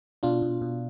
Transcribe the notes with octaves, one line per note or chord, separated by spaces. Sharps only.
B2 D4 F4
B2
B2